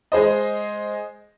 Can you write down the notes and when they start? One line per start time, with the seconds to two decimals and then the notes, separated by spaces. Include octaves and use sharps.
0.12 G#3 G#4 C5 D#5